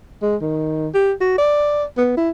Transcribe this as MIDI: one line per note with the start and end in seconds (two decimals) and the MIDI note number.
0.22 0.36 56
0.42 0.88 51
0.94 1.12 67
1.21 1.37 66
1.38 1.84 74
1.98 2.14 59
2.17 2.30 64